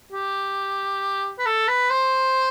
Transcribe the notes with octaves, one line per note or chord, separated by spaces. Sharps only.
G4
B4
A4
B4
C5